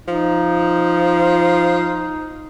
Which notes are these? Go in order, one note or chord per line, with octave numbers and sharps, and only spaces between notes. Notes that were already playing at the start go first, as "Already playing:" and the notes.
F3 D#4